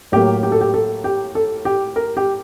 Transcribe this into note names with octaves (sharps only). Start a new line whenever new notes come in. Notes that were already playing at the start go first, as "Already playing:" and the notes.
A2 F#3 A#3 G4
G4
A4
G4
A4
G4
A4
G4
A#4
G4